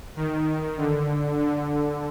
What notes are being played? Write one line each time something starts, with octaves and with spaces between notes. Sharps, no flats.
D#3
D3
D3